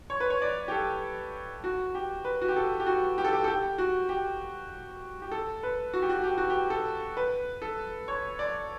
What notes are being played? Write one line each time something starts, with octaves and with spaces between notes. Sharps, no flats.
C#5
B4
C#5
D5
G4
A4
F#4
G4
B4
F#4
G4
A4
G4
F#4
G4
A4
G4
A4
G4
F#4
G4
G4
A4
B4
F#4
G4
F#4
G4
F#4
G4
A4
B4
A4
C#5
D5